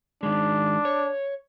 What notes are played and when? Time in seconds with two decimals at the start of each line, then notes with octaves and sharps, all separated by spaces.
0.23 D#3 G#3 D4
0.85 C#5